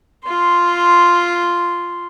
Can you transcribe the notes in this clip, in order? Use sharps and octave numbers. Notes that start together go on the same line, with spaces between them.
F4 C6